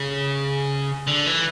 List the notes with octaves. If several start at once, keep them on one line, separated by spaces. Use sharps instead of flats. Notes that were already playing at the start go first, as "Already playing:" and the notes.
Already playing: C#3
D3
E3